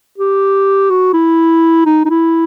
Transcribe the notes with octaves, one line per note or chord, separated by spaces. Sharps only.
G4
F#4
E4
D#4
D#4
E4